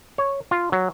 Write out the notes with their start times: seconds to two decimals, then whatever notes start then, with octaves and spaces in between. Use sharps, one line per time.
0.18 C#5
0.51 F4
0.72 F#3